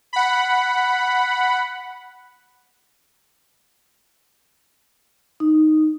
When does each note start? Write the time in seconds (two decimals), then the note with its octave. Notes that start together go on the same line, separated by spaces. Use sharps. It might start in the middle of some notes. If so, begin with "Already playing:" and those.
0.13 F#5 B5
5.40 D#4